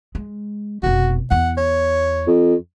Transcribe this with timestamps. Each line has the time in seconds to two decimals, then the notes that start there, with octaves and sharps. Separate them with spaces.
0.15 G#3
0.83 F1 B2 F#4
1.31 E2 E4 F#5
1.57 C#5
2.27 F2